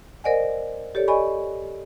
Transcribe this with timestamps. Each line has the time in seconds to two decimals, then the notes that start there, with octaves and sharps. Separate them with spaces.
0.24 A#4 C5 D5 D#5 F#5 G#5
0.95 G4 A4 C#5 D5
1.08 D5 D#5 G#5 B5 C#6